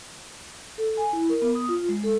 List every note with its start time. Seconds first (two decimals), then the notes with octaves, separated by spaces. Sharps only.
0.78 A4
0.97 G#5
1.13 E4
1.29 A#4
1.42 B3
1.55 D#6
1.69 F4
1.89 G#3
2.04 A4